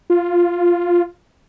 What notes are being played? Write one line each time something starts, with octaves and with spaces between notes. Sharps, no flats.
F4